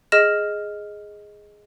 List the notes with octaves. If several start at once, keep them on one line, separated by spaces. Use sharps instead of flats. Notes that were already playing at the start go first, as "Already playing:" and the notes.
G#4 D#5 F6 A#6 E7